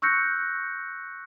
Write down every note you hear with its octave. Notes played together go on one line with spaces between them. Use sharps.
C#6 E6 F#6 G6 A#6 C#7